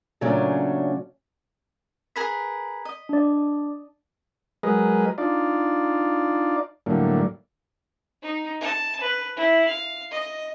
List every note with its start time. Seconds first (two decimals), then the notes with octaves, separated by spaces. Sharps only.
0.21 A#2 C#3 F#3 A3 C#4 D4
2.16 G#4 A#4 B4 B6
2.85 D#5
3.09 D4 D5
4.63 F#3 G#3 G#4 A#4 B4 D#5
5.18 D4 D#4 F4 D5
6.86 A2 D3 F#3 G3 A#3
8.22 D#4
8.60 A5
9.01 B4
9.36 E4
9.68 F5
10.11 D#5